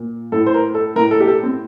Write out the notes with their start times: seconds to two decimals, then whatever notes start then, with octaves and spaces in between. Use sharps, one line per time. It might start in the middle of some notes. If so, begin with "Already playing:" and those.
Already playing: A#2
0.32 A2 A4
0.46 C5
0.54 A#4
0.74 A4
0.96 A2 A#4
1.11 A4
1.20 G4
1.28 A4
1.43 C4